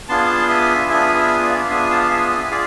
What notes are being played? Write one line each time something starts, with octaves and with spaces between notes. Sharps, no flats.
B3 D4 F4 G#4 A5 C6
E5 G#5
B3 D4 F4 G#4 E5 G#5
E5 G#5
D5 F5
B3 D4 F4 G#4 E5 G#5
F5 A5
E5 G#5
E5 G#5
G#5
F4 G#4 D5 F5